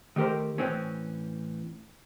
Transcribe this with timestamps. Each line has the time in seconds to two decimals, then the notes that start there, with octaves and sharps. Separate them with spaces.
0.16 D#3 A3 G4 A#4 C5
0.58 A2 E3 C4 C#4